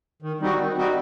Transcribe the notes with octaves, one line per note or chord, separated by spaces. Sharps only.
D#3
G3 C4 D#4 F#4
D#3
G3 C4 D#4 F#4